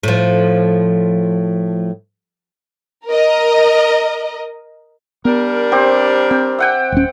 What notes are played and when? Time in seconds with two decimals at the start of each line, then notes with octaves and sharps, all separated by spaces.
0.03 A2 F3
3.07 A#4 D#5
5.25 G3 B3 D4 A#4
5.72 C4 G4 C5
6.31 C4 G5
6.59 E5 F#5 G5
6.92 D#1 C#4